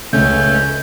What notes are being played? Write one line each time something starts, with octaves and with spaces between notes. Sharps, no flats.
C#2 C#3 A3 C#4 G6